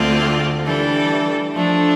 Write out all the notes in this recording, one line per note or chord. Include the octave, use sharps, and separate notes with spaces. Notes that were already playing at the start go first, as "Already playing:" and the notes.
Already playing: D2 D3 A3 C4 F4
E3 G3 D4 A4
F3 A3 D4